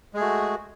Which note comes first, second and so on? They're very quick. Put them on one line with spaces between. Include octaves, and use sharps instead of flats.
G#3 G#4 A3 F#4